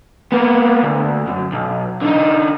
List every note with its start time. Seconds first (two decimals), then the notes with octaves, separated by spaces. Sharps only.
0.32 A#3 B3
0.84 D2
1.27 F#2
1.52 B1
2.02 D3 D#4